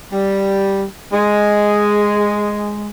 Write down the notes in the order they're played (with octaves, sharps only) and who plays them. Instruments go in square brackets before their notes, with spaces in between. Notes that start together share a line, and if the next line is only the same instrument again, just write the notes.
[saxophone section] G3
G#3